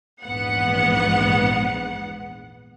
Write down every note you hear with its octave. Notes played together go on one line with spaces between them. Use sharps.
A#1 E2 G#2 B3 F#5